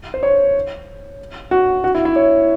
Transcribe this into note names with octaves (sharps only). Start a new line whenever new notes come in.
C5
C#5
F#4
F#4
E4
E4
C#5